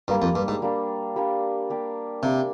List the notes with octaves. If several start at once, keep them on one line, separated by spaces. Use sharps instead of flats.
G2 G3 A#3 D4
F2
G2
G#2
G3 A#3 D4
G3 A#3 D4
A#3 D4 G4
C3 A#3 D4 G4